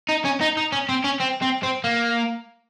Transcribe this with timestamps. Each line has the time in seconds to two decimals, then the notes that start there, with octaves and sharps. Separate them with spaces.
0.09 D#4
0.25 C#4
0.41 D#4
0.57 D#4
0.72 C#4
0.89 C4
1.04 C#4
1.20 C4
1.42 C4
1.63 C4
1.84 A#3